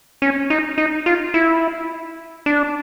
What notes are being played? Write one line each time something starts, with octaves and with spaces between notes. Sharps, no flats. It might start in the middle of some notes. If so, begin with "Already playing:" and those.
C#4
D#4
D#4
F4
E4
D4